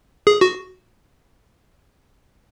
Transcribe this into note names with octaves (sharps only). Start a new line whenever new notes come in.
G#4
F#4